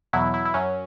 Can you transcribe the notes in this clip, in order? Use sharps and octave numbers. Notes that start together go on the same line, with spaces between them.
E2 B2 F#3 E4
E4
E4
F#2 F#3 C#4